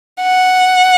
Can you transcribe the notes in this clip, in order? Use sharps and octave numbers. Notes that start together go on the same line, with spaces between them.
F#5